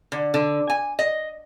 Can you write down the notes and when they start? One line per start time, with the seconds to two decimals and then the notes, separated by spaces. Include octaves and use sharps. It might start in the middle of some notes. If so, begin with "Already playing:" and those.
0.12 D3
0.34 D3
0.70 G#5
0.99 D#5